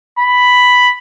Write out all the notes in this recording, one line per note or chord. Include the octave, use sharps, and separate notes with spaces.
B5